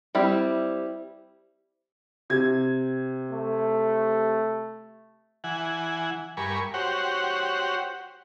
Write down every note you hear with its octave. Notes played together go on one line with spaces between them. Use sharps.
G3 C4 E4
C3 G#6
A3
E3 F#5 G#5
G2 A#4 G#5 B5 C#6
F#4 G4 C5 C#5 F#5